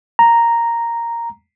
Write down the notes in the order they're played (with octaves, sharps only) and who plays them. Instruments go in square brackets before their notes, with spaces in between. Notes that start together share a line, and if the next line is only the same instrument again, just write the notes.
[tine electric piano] A#5